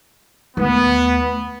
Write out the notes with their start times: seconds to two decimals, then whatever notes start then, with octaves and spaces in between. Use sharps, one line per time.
0.57 D#2 A3 B3